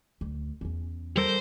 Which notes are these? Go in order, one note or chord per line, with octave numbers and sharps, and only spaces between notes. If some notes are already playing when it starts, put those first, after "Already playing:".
D2
E2 C#4
G3 A4 A#4 C5